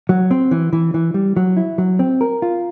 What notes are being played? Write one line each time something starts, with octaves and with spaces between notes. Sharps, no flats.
F#3
C4
E3
E3
E3
G3
F#3
E4
F#3
C4
A#4
F4